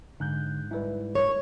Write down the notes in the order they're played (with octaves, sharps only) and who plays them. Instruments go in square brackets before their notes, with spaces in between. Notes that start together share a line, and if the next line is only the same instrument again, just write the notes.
[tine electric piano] G#2 [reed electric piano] D3 F#6 G6
[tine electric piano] G#2 G3 [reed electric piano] E4 B4
[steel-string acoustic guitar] C#5